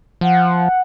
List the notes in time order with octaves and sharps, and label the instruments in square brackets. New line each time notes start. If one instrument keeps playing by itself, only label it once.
[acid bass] F3 [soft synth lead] F#5